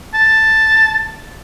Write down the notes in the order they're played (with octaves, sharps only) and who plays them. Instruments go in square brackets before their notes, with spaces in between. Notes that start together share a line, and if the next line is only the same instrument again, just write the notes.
[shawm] A5